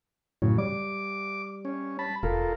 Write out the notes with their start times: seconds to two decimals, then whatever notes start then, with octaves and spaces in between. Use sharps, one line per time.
0.42 F#2 A2 C#3
0.58 G3 D6
1.65 C#4
1.99 A5 B5
2.23 E1 F4 A4 A#4